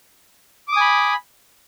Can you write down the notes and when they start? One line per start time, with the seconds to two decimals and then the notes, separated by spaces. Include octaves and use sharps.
0.68 D6
0.72 D#6
0.77 G#5
0.81 B5